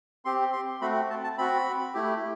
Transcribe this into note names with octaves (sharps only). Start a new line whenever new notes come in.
C4 G4 C6
C6
A3 C4 F#4 B5
A5
A5
C4 F#4 B5
A3 E4 G4